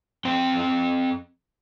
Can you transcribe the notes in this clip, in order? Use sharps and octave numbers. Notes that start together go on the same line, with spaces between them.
F2 C4 G5